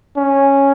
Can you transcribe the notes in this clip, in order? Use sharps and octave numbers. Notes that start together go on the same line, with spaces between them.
C#4